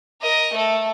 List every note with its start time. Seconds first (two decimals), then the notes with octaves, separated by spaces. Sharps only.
0.21 A#4 D#5
0.53 A3 A4